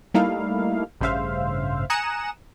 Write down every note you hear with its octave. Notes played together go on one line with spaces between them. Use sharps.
G3 A3 A#3 D#4 E4 F5
A1 G2 C#3 C5 E5 F5
G#5 A#5 D#6 F#6 C#7 E7